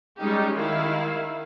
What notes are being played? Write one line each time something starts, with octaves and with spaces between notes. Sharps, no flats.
G3 G#3 C#4 D#4 G4
D#3 E4 F5